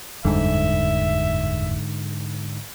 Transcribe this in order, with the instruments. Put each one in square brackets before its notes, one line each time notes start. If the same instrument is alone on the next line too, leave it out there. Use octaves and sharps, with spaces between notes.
[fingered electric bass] F#1 E2 G3 [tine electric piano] G#2 D3 [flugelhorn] E5